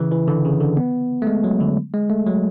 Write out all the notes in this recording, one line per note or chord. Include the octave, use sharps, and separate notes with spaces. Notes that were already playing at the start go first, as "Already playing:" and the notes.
Already playing: C#3 E3
E3
D3
C#3
D3
B3
A3
G#3
F#3
D3
G#3
A3
F#3